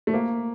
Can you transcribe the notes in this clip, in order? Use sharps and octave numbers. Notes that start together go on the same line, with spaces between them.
A3
A#3